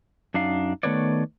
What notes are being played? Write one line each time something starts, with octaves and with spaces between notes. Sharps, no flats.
F#2 D4 D#4 F5
D#3 A3 B3 B4 C#5 D5